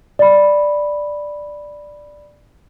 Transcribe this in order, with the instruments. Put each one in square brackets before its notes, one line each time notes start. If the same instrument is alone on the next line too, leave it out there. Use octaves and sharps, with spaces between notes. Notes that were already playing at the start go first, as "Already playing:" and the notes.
[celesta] D5 B5